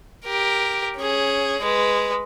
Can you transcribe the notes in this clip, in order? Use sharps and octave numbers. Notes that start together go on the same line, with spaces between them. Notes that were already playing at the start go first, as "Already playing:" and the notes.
G4 A#4
C#4 G#4
G#3 B4